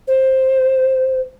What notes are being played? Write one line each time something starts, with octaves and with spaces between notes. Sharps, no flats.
C5